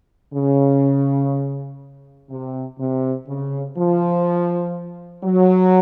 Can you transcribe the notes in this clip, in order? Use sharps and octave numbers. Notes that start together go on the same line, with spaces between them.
C#3
C3
C3
C#3
F3
F#3